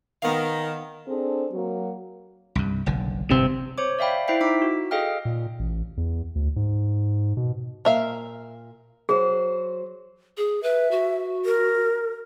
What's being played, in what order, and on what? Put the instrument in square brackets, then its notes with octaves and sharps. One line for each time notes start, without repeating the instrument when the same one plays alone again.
[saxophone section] D#3 [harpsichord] B3 F5
[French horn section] C4 D4 G#4 A4
F#3 A#3 F#4
[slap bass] C2 G2
F#1 B1 D3
[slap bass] G1 A2 [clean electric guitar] C3 C4
[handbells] C5 C#5 D6
D5 E5 F5 G5 B5
E4 C5 E5 G5 C7
D#4 D6 B6
F#4
G#4 A4 D#5 F5 G5 F6
[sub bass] A#2
A1
E2
D2
G#2
B2
[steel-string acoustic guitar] A#2 [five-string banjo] A#4 E5 F5
[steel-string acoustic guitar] F#3 C5 [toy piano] G#4
[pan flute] G#4
[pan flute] B4 [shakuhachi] E5
[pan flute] F#4
[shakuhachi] A#4